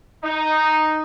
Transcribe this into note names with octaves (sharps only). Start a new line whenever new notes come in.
D#4